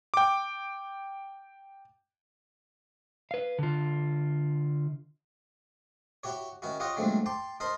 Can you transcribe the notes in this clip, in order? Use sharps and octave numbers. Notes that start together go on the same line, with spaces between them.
G5 D6
B4 F5
D3 F4
E4 F#4 G4 C#5
D#3 C#4 E4 F#4
F4 G4 C#5 D#5 F#5
A#2 F#3 G#3 A3 C4 D4
G5 A5 C6 D6
D#4 A#4 C5 A5 B5 C6